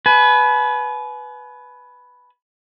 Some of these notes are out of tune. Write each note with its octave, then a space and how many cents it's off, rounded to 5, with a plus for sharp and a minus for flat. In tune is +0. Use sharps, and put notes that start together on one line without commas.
B4 +0 G#5 +40